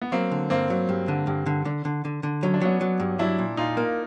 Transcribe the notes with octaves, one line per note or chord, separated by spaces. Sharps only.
B3
F#3 A#3 C4
D3
G2 A#3 C4
F#3
G2
D3
G2
D3
D3
D3
D3
D3
F#3 C#4
D4
F#3 B3 C#4
F#3
G2
F#3 D4 E4
A#2
A#2 D#4 F4
A#3